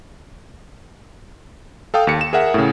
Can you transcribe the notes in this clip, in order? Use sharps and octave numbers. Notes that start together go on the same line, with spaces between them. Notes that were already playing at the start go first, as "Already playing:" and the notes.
A4 F5 G5 D#6
D#2 C#7
E7
G#4 A#4 E5 F#5
A2 C#3